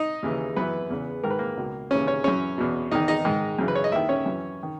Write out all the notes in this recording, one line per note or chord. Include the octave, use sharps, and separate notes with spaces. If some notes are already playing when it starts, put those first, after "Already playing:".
Already playing: D#4 D#5
D#2 C#3 E3
F#2 E3 B3 B4
E2 C#3 E3
G#2 D#3 A#4
B4
A#3 A#4
C#2 B2
D#2 C#3 E3 C#4 C#5
C#4 C#5
F#2 E3 C#4 C#5
E2 B2
E2 D#3 D#4 D#5
D#4 D#5
G#2 D#3
F#2 C#3 E3
B4
C#5
D#5
D#2 D#3 E4 E5
C#4 C#5
F#2 E3
D#3